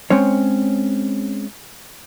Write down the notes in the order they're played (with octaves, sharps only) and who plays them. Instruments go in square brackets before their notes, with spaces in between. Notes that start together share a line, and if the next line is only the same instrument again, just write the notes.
[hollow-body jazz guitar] G#3 C4 C#4 C#5